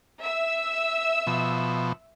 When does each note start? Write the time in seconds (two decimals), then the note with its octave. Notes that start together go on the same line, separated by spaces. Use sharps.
0.20 E5 E6
1.27 B2 F3